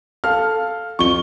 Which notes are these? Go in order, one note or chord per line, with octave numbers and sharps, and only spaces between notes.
A4 F5 F6
F2 C#6 G7